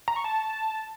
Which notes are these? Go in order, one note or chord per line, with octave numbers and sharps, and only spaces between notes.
A#5
C#6
A5